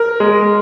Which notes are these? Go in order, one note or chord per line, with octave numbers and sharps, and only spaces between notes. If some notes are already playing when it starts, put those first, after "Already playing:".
Already playing: A#4
G#3